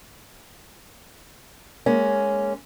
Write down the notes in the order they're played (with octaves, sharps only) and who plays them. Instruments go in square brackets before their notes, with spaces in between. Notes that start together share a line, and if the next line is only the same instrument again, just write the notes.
[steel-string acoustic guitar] G#3 A#3 C#4